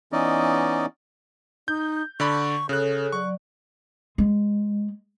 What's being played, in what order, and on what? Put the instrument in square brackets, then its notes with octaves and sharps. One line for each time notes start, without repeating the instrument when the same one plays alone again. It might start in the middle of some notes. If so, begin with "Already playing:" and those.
[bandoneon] E3 B3 C#4 D#4 D5 D#5
[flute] D#4 [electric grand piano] G6
[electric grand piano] D3 D5 B5 [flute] C#6
[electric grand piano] C#3 F#6 [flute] G#4 [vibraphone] A4 C#5
[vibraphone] F#3 D5 [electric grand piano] C#6
[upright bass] G#3